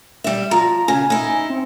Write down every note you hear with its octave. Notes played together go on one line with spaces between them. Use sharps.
G3 E5
F3 A#5
C#3 G#5
D#4 E4
C4